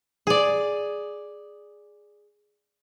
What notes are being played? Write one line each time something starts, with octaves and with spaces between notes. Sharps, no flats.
G#4 D5